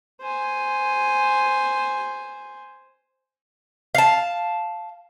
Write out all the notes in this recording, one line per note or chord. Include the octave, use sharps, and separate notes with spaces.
C5 G#5
F5 A5